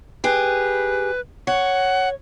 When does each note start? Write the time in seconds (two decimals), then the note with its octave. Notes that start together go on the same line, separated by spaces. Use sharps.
0.24 G4 G#4 B4
1.47 C#5 F#5